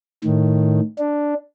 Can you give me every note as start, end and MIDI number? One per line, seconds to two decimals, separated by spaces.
0.24 0.80 45
0.24 0.80 51
0.98 1.34 62